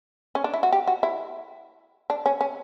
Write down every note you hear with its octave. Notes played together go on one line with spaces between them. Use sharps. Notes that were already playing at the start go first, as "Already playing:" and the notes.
C#4
D4
E4
F#4
G4
F#4
E4
D4
C#4
C#4